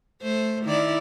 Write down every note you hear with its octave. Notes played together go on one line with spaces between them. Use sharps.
A3 C5
D#3 E4 D5